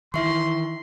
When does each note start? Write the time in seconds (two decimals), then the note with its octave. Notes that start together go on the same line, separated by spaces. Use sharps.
0.14 D#3 E3 E4 E5 C6 C#6